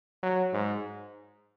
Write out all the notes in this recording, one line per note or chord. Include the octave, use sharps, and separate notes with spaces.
F#3
G#2